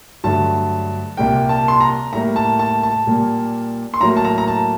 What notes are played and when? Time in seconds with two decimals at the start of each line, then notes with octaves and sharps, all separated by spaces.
0.24 G2 D3 F#3 A3 A5
1.17 C2 A#2 G3 A#3 G5
1.49 A5
1.68 C6
1.81 A#5
2.13 A2 G3 A#3 A#5
2.36 A5
2.59 A5
2.83 A5
3.07 A#2 G3 A#3
3.94 C6
4.00 A2 F#3 A#3 A#5
4.17 A5
4.25 A#5
4.38 A#5
4.48 A5